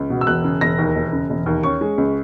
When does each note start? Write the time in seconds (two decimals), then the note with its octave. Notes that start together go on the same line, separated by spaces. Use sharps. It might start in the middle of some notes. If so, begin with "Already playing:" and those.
Already playing: C#2
0.10 B2
0.21 E6
0.27 E1 F#6
0.44 C#3
0.61 E1 A#6
0.78 D#2
0.96 E1
1.13 C#3
1.30 E1
1.46 D#2
1.63 C#4 C#6
1.81 G#3
1.98 C#2